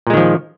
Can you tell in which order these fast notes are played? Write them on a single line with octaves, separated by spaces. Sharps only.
A#2 G#3 D#3 F3